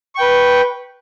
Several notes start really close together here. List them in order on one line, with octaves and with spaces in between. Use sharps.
C#6 G5 B4